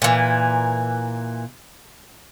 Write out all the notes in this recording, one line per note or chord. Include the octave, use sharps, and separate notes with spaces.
A#2 E3